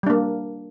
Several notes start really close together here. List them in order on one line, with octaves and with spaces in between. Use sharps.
G3 D4 A#3